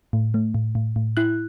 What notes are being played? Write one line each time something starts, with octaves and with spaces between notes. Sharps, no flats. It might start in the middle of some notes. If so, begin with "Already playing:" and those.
A2
A3
A2
A2
A2
E4 F#6